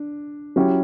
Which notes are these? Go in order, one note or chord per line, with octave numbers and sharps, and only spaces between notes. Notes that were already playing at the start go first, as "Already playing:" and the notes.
Already playing: D4
F#3 C#4 E4 G4